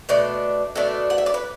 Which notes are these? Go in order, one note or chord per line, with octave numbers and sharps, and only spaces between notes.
B2 A3 D4
B2 A3 D4 A4
F#5
E5
D5
B4